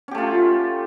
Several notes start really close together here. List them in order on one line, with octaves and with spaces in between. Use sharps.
C#4 G4 A3 F4